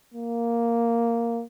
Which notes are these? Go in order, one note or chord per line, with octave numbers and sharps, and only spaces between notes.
A#3